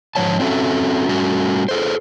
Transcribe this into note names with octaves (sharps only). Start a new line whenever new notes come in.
G#2 F3 C#5 A5
C4 C#4 F#4 A4 E5
G3 A3 C#4 F#4
G#4 A4 C5